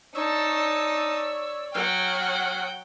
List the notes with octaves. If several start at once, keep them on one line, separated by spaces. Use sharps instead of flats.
D#4 C#5 D5 A5 E6
F#3 F#5 G5 F6